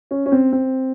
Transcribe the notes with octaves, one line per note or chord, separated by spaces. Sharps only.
C#4
C#4
C4
C4